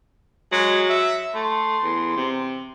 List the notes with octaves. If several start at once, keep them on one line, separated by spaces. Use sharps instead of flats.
F#3 G#3
E5
A3 C6
E2
C3